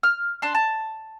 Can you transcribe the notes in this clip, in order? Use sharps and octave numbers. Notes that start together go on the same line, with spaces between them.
F6
D4 A5 C6
A5